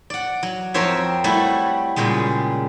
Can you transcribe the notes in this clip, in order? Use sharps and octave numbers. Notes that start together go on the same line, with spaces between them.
D5 F#5
F#3
F2 C4 A#4 C5 C#5 E5
G3 A3 E4 F#4
A#2 C#3 G3 G#3